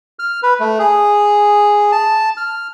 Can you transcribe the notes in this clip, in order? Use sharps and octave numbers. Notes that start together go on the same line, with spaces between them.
F6
B4
A3
G#4
A5
F6